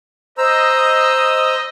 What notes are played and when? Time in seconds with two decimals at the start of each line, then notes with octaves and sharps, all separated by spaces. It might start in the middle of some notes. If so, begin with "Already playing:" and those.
0.38 C5 D#5 A#5 E6